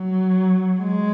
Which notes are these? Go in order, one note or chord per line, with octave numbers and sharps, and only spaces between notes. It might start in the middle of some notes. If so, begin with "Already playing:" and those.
Already playing: F#3
G#3